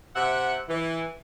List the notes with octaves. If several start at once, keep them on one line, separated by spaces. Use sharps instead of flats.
C3 E5 F#5
E3